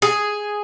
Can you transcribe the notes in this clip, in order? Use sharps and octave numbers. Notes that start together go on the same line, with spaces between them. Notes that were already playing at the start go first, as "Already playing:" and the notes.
G#4